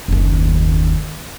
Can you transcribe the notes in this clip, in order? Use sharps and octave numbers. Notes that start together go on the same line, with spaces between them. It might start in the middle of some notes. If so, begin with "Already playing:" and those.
F#1 D#2